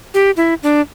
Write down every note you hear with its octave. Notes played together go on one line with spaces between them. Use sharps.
G4
E4
D4